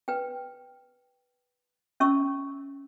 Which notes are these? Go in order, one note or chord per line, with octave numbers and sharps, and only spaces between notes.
B4 G5
C#4 E5 C#6 E6